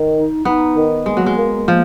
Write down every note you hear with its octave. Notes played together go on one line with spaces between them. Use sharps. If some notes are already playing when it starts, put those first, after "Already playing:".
Already playing: D#3
D#4
B3 D#4
D#3
G#3 A#3
F#3
G#3
A#3
F3 A#3